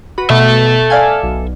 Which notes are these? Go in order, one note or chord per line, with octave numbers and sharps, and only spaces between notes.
F#4 B4
B2 A4 E5
D5 F5 G#5
B1